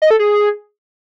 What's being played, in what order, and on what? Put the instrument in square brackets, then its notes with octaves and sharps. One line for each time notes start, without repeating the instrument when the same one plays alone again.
[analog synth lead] D#5
A4
G#4